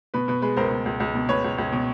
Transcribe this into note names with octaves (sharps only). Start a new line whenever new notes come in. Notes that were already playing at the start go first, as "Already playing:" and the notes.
B2 B4
B2 B4
G#3 B4
C#2 A#4 C5
B2
C#2
C#2
B2
B2 B4 C#5
C#2
C#2
B2